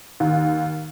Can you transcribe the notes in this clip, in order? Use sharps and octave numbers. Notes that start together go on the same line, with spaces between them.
D#2